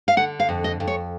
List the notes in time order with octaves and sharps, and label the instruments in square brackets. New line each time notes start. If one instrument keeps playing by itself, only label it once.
[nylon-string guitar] F5
D3 F#5
F5
F2
D#5
F2
C#5